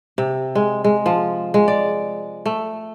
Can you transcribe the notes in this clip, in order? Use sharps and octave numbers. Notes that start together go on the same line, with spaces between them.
C3
G#3
G#3
F3
G#3
D5
A3